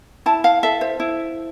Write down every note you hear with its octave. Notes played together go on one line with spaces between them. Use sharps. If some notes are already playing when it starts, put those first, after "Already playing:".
E4 A5
F5
A4 E5
C5
E4